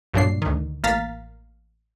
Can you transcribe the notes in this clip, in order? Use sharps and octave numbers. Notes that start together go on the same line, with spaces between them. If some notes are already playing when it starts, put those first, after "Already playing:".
B1 G2 A#2 F#3 D4 C7
D2 D#3
A1 A#3 F5 A#5 A6 B6